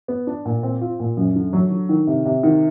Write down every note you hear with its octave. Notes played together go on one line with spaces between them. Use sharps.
B3
D4
A#2
C4
F4
A#2
F#2
D3
F#3
D3
D#3
C3
C3
D#3